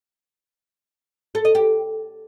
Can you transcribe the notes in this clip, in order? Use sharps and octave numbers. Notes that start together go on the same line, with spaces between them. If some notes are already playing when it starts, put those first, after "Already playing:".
A4
D#5
G4